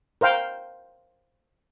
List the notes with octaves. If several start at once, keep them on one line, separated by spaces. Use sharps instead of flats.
A#4 C5 F5 G5